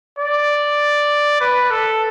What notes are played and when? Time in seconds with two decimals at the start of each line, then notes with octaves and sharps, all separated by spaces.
0.19 D5
1.41 B4
1.71 A4